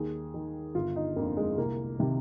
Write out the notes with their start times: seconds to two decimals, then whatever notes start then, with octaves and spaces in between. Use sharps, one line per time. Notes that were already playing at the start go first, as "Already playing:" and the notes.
Already playing: D#2 G#4
0.34 D#3
0.75 G1 F4
0.96 D#4
1.16 F2 D3 A#3
1.37 G#3
1.58 C2 A#3
1.99 C3 D#3